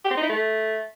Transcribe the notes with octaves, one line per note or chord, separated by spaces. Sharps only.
G4
C4
D#4
E4
A3